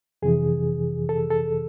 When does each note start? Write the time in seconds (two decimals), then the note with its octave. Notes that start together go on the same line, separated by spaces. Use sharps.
0.22 F2 C3 E3 G#4
1.09 A4
1.31 A4